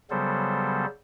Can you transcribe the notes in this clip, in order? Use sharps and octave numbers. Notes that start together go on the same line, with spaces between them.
C#3 F#3 G3 B3 A4 C5